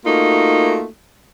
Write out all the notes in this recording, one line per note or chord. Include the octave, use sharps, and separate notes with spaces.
A3 A#3 D#4 F4 F#4